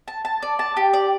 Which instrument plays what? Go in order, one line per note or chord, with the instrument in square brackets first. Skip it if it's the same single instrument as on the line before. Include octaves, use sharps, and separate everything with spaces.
[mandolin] A5
A5
D5
A5
G4
D5